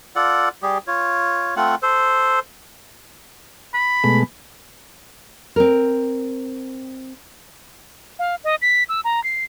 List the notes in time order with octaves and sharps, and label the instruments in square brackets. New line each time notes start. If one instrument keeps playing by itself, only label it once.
[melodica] F4 A4 D5 F#5
G3 G4 G#4
F4 C#5
A3 C4 F4 F#5
A4 C5
[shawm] B5
[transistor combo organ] B2 G#3 A3
[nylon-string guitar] C4 A#4
[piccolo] F5
D#5
B6
E6
A#5
C7